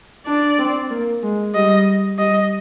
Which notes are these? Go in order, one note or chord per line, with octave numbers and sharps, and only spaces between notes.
D4 D5
C4
A#3
G#3
G3 D#5
G3 D#5